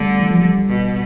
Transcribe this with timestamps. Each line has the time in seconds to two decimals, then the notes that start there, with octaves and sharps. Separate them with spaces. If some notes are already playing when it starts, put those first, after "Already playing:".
Already playing: D3 G3 A3 B3
0.20 E3
0.30 F3
0.40 G3
0.68 B2